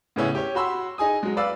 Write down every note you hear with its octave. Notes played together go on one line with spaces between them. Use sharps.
A2 C#3 B3 C#4 E4
G4 C#5
F#4 B5 C6 E6
D#4 G#4 G#5 D#6
F#3 G#3
B4 D5 F5 E6